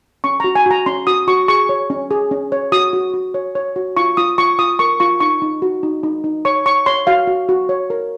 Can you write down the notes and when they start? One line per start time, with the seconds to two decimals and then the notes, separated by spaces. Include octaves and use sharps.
0.24 C#4 C#6
0.40 A#5
0.44 F#4
0.55 G#5
0.66 F#4 A#5
0.86 C#4 C6
1.07 F#4 D#6
1.28 F#4 C#6
1.48 G#4 C#6
1.69 C#5
1.90 C#4
2.11 G#4
2.31 C#4
2.52 C#5
2.72 F#4 D#6
2.93 F#4
3.14 F#4
3.34 C#5
3.55 C#5
3.76 F#4
3.97 F4 C#6
4.17 F4 D#6
4.38 F4 C#6
4.59 F4 D#6
4.79 A#4 C#6
5.00 F4 C#6
5.20 D#4 C#6
5.42 D#4
5.62 F#4
5.83 D#4
6.03 D#4
6.24 D#4
6.45 C#5 C#6
6.66 C#5 C#6
6.86 C#5 C6
7.07 F#4 F5
7.27 F#4
7.49 F#4
7.69 C#5
7.90 A#4